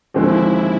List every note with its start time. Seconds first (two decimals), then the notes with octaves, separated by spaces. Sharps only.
0.14 D#2 D3 F3 G#3 C4 E4